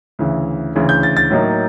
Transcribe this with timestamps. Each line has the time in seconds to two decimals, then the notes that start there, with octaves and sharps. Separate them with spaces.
0.19 D2 C#3 E3
0.75 D2 C#3 E3
0.89 G6
1.03 A6
1.17 A6
1.31 A2 F#3 A#3 D#4